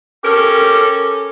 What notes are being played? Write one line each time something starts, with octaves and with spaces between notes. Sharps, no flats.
C#4 G4 A4 A#4